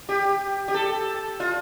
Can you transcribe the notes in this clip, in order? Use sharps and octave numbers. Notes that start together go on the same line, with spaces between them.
G4
G4
A4
F4